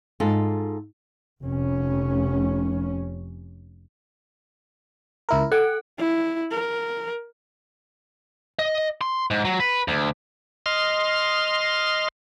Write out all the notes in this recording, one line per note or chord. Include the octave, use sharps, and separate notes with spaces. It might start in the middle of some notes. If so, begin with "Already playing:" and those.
G#2 F4 A4
F1 C#4
C#2 E4 A#4
A4 F#5
E4
A#4
D#5
C6
G#2
F#3
B4
D2
D#5 C6 F6